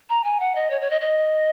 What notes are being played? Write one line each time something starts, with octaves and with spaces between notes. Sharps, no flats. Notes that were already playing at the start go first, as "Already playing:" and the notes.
A#5
G#5
F#5
D#5
C#5
C#5
D#5
D#5